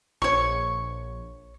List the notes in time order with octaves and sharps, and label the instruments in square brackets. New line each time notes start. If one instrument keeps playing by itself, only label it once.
[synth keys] A#1 [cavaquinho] C#5 C#6